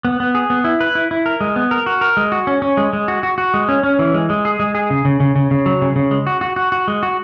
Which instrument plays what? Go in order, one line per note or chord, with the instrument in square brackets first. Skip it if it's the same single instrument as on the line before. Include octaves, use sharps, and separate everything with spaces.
[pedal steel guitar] B3
B3
G#4
B3
E4
B4
E4
E4
A#4
G#3
B3
A#4
F#4
A#4
G#3
F#4
C#4
C#4
G#3
G#3
F#4
F#4
F#4
G#3
C#4
C#4
E3
G#3
G#3
G#4
G#3
G#4
C#3
C#3
C#3
C#3
C#3
F#3
C#3
C#3
G#3
F#4
F#4
F#4
F#4
G#3
F#4